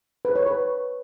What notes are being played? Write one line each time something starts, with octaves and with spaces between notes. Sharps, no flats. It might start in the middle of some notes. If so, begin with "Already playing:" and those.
B4
C#5
B4